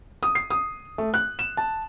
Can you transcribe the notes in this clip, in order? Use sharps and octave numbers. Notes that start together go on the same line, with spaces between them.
D#6
C7
D#6
A3
F#6
E7
A5